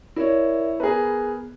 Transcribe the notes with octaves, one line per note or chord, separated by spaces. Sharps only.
E4 A#4 C#5 D5 E5
B3 G#4 A#4 B4